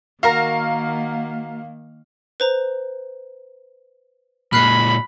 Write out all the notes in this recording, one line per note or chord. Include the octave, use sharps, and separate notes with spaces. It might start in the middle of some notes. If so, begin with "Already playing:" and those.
D#3 A#3 F#4 A#4 F5 A#5
B4 C5 A#5
A#2 G#3 B5 F6 F#6 C7